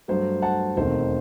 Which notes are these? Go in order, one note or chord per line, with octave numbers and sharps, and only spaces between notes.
G2 F#3 A3 C5
F#5 A5
E1 D#2 D#3 A3 C4 C5